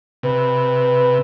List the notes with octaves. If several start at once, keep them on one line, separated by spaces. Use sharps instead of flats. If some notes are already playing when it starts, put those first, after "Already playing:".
C3 B4